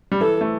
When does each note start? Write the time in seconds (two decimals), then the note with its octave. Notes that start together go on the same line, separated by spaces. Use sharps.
0.12 G3
0.21 E3 A4
0.41 A3